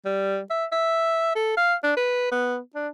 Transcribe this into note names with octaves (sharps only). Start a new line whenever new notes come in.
G3
E5
E5
A4
F5
D4
B4
B3
D4